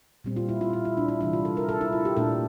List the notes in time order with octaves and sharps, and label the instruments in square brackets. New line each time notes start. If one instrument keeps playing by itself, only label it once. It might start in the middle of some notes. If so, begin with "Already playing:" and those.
[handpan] A#2 G3 C4
F4
E4
F4
E4
E4
D4
E4
C3 E3 G3 D4 E4
F4
A4
A#4
A4
E4
F4
G4
A#2 A3 D4 A4